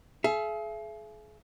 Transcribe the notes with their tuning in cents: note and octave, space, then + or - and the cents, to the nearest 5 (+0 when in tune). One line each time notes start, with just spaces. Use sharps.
G#4 +40 E5 +40